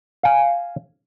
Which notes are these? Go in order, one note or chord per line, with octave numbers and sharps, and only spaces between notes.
F5 G#5